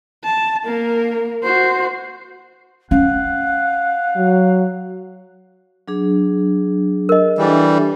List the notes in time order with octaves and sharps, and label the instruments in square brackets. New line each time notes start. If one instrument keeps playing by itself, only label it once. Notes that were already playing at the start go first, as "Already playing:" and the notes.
[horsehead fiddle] A5
A#3 A#4
F#4 C5
[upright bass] C#4 [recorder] F5 [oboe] F#5
[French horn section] F#3
[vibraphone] F#3 D4 G#4
[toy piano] A#4 D#5
[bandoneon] E3 G3 [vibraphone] D4 A4 E5